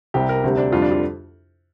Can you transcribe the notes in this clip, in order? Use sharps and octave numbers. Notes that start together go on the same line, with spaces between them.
C2 C3 G3 G4
A#4
D2 C3 G3
D4
F2 D3 G3 F4
D4
F4